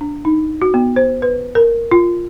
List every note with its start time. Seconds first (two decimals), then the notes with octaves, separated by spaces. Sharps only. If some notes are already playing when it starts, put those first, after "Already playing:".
0.01 D4
0.25 D#4
0.62 F#4
0.74 B3
0.96 C5
1.22 B4
1.55 A#4
1.91 F4